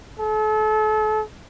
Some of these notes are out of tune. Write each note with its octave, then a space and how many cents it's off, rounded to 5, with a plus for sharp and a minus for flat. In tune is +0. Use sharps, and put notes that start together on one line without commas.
A4 -35